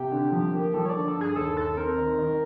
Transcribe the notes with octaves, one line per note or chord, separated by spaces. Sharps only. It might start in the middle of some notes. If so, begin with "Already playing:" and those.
Already playing: C3 G4
D3
F3
A#3
F3 A4
C#5
D5
D3
A4
G2
G#4
D#2 A4
D#2 A4
C4 A#4
D#3
D#3